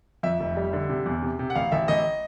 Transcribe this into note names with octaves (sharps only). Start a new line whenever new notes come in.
F2 E5
F1
G3
D3
C3
E2
C3
C3
F#5
A1 F5
A1 E5
A1 D#5